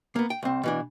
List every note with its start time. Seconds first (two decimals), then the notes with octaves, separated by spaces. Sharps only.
0.16 A#3 B3
0.30 G5
0.43 C2 C4
0.63 B2 E3 D4